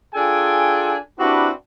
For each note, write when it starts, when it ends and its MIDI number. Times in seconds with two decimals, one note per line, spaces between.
0.14 0.95 62
0.14 0.95 65
0.14 0.95 68
0.14 0.95 69
0.14 0.95 79
0.14 0.95 80
1.19 1.49 60
1.19 1.49 62
1.19 1.49 64
1.19 1.49 66
1.19 1.49 67
1.19 1.49 71